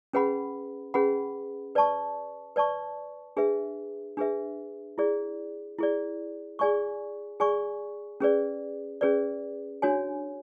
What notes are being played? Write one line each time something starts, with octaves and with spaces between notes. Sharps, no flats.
C#4 G#4 B4 F#5 B5
C#4 G#4 B4 F#5 B5
B4 D5 A5 C#6
B4 D5 A5 C#6
D4 G#4 B4 E5
D4 G#4 B4 E5
E4 G#4 D5
E4 G#4 D5
G#4 D5 G#5 C#6
G#4 D5 G#5 C#6
C#4 G#4 B4 D5
C#4 G#4 B4 D5
D4 F#4 C#5 G#5